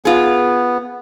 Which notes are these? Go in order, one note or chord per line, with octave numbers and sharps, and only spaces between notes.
B3 F4 G#4